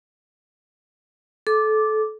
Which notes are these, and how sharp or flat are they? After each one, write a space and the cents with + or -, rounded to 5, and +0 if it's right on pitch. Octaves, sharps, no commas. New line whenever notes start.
A4 -25 D6 +0